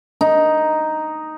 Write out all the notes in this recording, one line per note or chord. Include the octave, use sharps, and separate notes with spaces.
D#4